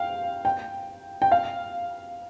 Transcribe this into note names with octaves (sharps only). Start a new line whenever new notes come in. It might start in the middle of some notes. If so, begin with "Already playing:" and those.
Already playing: F5 G5
G5
G5
F5